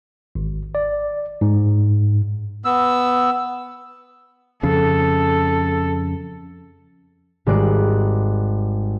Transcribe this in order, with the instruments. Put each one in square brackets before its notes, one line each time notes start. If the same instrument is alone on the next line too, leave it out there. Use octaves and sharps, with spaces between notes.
[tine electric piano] G#1
D5
G#2
[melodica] B3 E6
[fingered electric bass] F2 C#3 [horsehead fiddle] A4
[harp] G#1 G3 G#3 D5 F#6 D7